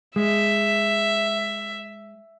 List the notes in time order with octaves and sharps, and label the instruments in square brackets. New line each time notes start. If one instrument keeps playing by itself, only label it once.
[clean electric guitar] G#3 [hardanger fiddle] E5